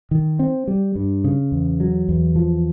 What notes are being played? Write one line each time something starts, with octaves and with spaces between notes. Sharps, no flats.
D#3
C4
G3
G2
C#3
E2
F#3
E2
F3